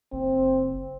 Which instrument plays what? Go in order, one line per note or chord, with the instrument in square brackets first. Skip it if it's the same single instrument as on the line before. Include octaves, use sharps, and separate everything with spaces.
[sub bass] F#1 [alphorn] C4